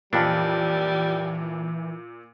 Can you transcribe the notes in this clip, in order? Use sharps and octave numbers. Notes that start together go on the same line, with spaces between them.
F2 A#2 E3 G3 C#4 D4